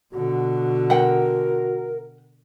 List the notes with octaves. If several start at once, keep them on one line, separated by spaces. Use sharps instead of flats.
B2 D3 F#4
A#4 F#5 G5